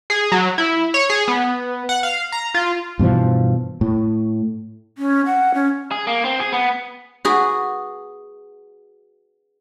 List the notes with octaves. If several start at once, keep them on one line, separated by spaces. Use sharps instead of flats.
G#4
F#3
E4
C#5
G#4
B3
F#5
F5
A#5
F4
G2 B2 E3 F3
A2
C#4
F#5
C#4
G#4
A#3
C4
G#4
B3
F#4 G#4 B4